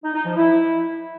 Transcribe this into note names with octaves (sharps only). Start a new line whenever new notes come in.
D#4
D#4
F3
E4